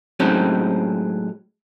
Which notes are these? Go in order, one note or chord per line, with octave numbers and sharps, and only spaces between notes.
A2 F#3 G#3 C4 C#4 D#4